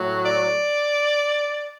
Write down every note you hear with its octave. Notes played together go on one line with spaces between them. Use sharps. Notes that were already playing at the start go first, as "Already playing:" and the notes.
Already playing: A2 F#3
D5